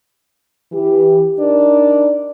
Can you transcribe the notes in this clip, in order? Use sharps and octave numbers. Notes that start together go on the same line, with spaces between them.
E3 G4
D4 D#4 A#4 D5